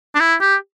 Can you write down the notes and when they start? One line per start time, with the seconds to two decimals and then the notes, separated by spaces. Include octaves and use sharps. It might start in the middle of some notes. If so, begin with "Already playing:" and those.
0.15 D4
0.20 E4
0.41 G4